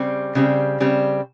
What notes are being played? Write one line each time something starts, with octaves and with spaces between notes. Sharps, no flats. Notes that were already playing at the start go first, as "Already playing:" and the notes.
Already playing: C#3 G3 C4
C#3 G3 C4
C#3 G3 C4